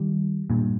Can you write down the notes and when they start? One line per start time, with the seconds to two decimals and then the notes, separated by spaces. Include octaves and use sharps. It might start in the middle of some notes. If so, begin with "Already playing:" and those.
Already playing: D#3 G3
0.50 G2 A#2